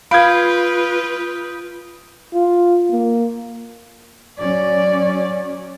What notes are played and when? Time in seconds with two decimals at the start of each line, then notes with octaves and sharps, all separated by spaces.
0.11 F4 B4 F5 B5 D#6 G6 G#6 D7
2.34 F4
2.91 A#3
4.39 F#3 C#4 D5